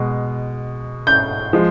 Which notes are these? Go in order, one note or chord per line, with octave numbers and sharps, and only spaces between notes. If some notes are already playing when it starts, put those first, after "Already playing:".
Already playing: B2 G#3
G6
F3 G#3